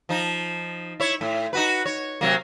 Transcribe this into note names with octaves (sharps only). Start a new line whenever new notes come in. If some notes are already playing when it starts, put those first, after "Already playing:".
F3 D#4
E4 C#5
A2
D#4 F#4 B4
C#5
C3 F#3 A#3